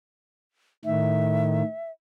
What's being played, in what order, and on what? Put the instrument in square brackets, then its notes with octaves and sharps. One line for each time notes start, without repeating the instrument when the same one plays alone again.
[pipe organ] A2 D#3 [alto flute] E5